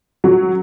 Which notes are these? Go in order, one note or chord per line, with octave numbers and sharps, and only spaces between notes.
F#3